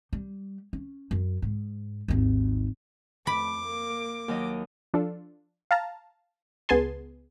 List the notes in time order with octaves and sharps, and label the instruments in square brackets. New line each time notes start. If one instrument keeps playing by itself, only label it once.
[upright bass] G3
C#4
F#2
G#2
G#1 D#2
[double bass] F2 A3 [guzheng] B5 [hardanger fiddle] D6
[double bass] A#3
[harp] D#2 F#3 D#5
[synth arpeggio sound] F3 D4 F4 A4
F5 A5 A#5
C#2 B3 G#4 G#5 A5 C6